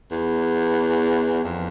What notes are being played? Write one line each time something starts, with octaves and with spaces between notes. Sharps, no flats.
E2
F2